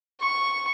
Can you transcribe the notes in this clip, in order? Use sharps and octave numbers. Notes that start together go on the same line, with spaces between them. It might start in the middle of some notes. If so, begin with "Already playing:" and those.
C#6